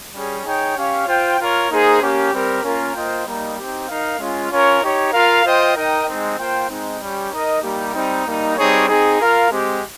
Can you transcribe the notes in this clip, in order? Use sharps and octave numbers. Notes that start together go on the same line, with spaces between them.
G3 C#4 G#4
D#4 G#4 C#5 G5
C#4 G4 C#5 F5
F4 C5 G5
F4 A#4 C#5
A#3 D#4 G#4 C5
A#3 C#4 G4
G3 C4 G4 A#4
A#3 C#4 F4 A#4
A#3 F4 C5 D#5 G5
G3 A#3 D#4
C4 D#4 G4
D#4 A#4 F5
G#3 C#4 F4
C#4 F4 A#4 C#5
D#4 G4 C#5
F4 A#4 F5
F4 C5 D#5 G5
D#4 A#4 D#5 G5
G#3 C4 D#4
A#3 F4 C5 G5
G#3 C4 D#4
G3 C#4 G4
D#4 A#4 D#5
G3 A#3 D#4 G4
G3 C4 D#4
G3 A#3 D#4
G3 C4 D#4 G#4 C#5
C4 D#4 G#4
F4 A#4 F5
G#3 C4 G4